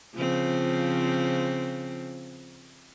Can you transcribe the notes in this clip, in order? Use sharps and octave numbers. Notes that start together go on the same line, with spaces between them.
C#3 F3 C4